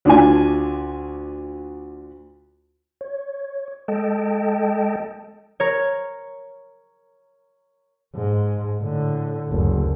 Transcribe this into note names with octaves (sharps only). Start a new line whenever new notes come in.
D2 D4 F4 G#5
C#5
G#3 A4 D#5 G5 A5
A#4 C#5
G#2
A2 D3
F#1 D2